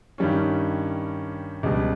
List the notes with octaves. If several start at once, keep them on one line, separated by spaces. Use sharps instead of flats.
G2 D#3 G3 C#4
C#2 B2 G3